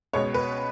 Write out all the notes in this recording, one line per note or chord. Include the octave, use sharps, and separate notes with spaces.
C#2 B2 G#3 B3 C#5
B4